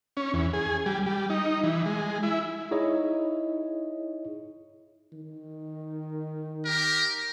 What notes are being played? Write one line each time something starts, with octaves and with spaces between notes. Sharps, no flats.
C#4
E2
G#4
G3
G3
D#4
E3
G#3
E4
D#4 E4 G#4 C#5 D#5
D#3
G4 A#4